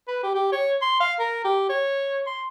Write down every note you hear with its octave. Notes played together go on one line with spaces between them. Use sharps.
B4
G4
G4
C#5
C6
F5
A#4
G4
C#5
C6